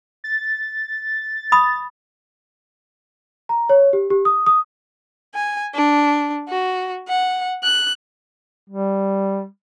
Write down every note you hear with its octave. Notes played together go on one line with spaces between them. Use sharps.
A6
B5 D#6
A#5
C#5
G4
G4
D#6
D#6
G#5
D4
F#4
F#5
F#6
G3